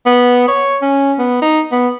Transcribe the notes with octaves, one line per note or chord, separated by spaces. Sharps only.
B3
C#5
C#4
B3
D#4
B3